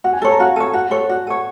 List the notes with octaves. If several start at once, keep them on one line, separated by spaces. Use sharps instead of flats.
F#4 F#5
G#5
A4 C#5 A5
A#5
F#4 F5
A4 C#5
F#4 F#5
A4 C#5
F#4 D5
A4 C#5